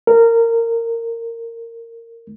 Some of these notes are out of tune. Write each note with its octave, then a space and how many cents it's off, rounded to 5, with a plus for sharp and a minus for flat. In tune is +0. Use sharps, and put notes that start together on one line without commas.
A#4 -20